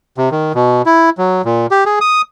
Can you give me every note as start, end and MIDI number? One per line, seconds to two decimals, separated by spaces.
0.18 0.29 48
0.31 0.52 51
0.55 0.82 47
0.86 1.10 64
1.18 1.42 54
1.45 1.66 46
1.71 1.84 67
1.86 1.99 68
2.01 2.22 87